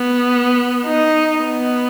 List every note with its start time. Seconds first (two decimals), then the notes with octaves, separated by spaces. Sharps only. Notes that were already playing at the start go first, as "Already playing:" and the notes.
Already playing: B3
0.86 D#4
1.39 B3